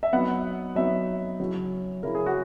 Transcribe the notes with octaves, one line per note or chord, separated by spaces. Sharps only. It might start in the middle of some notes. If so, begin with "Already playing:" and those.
E5
F#3 B3 D#4 F#5
F#3 B3 D#4 E5
C#3 F#3 C#4 E4
C#3 F#3 C#4 E4 A#4
G#4
F#4